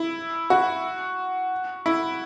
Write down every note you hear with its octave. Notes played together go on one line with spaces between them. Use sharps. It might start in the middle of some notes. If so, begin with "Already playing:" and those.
Already playing: E4
F#4
E4